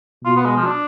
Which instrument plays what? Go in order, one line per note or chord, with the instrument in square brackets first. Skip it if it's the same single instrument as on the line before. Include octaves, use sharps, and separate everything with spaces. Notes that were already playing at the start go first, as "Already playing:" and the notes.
[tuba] B2 [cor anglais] F4
[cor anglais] B3
G#3
F3
D4